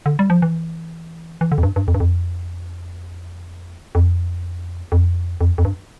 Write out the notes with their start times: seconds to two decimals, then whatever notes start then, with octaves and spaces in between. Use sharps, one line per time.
0.06 D3
0.19 G3
0.30 F3
0.42 E3
1.41 E3
1.52 D3
1.58 F2
1.63 G2
1.76 G2
1.88 F2
1.94 G2
2.00 F2
3.95 F2
4.92 F2
5.41 F2
5.58 F2
5.65 G2